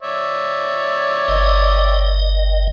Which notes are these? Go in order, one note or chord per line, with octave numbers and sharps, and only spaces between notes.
C#5 D5 E5
G1 D#5